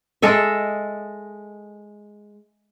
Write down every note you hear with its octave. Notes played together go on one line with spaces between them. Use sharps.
G#3 A4 D#5 E5